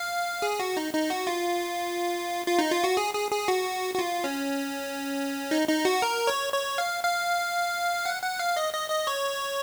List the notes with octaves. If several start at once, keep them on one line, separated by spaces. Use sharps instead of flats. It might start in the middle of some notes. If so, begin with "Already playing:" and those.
Already playing: F5
G#4
F#4
D#4
D#4
F#4
F4
F4
D#4
F4
F#4
G#4
G#4
G#4
F#4
F#4
F4
C#4
D#4
D#4
F#4
A#4
C#5
C#5
F5
F5
F#5
F#5
F5
D#5
D#5
D#5
C#5